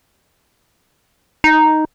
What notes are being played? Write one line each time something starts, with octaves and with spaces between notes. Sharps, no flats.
D#4